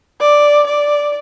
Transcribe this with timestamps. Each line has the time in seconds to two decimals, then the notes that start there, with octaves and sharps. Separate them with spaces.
0.20 D5
0.67 D5